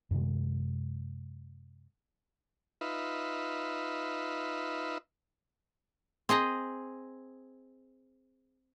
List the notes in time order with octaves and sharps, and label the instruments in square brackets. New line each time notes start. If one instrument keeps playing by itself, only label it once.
[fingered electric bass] F#2 C3 D#3 G#3
[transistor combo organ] D#4 F4 B4 E5
[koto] C4 G#4 D#5 A#5